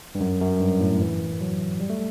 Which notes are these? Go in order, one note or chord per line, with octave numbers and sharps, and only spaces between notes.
G2
F#2
F#2
G2
A2
E3
F#3
G3
A3